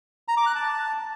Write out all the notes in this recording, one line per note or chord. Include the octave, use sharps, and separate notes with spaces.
A#5
D6
F#6
A5